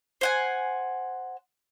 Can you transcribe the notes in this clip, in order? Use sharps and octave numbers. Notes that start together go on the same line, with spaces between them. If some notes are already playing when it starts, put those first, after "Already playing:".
C5 F#5 G#5